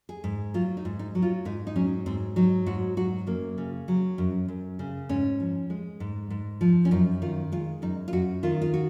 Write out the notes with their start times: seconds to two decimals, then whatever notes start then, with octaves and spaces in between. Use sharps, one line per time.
0.09 G#4
0.24 G#2
0.54 F#3 F4
0.77 D#4
0.85 G#2
0.99 D#4
1.15 F#3
1.22 F4
1.45 G#2 D#4
1.67 D#4
1.76 F#3 C#4
2.06 G#2 C4
2.36 F#3 D#4
2.66 G#2 F#4
2.97 F#3 F#4
3.27 F#2 A#3
3.58 C#3
3.88 F#3
4.18 F#2
4.48 F#2
4.79 C#3
5.09 G#2 C#4
5.40 F3
5.70 G#3
6.00 G#2
6.30 G#2
6.61 F3
6.85 C#4
6.91 F#2 D#4
7.22 D#3 F4
7.52 G#3 F4
7.82 F#2 D#4
8.08 F4
8.13 F#2 F#4
8.43 D#3 F4
8.62 F4
8.74 F#4